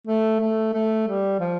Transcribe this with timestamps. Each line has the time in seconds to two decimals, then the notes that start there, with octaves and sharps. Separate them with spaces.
0.07 A3
0.40 A3
0.73 A3
1.07 G3
1.40 F3